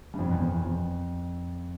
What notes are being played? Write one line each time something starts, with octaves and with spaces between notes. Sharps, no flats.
G2
F2
E2
F2
E2
F2